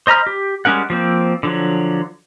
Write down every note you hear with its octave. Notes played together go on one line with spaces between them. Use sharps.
C5 D#5 A#5 B5 F6
G4
G3 G#3 C#4 A#4 F#5
F3 A#3 C4
D3 F3 F#3